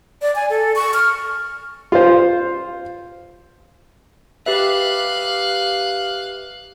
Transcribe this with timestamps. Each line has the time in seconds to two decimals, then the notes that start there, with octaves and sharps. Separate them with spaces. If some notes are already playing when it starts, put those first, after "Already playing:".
0.22 D5
0.36 G#5
0.50 A4
0.76 C#6
0.94 F6
1.92 F4 C5
4.46 G4 B4 E5 F5 F#6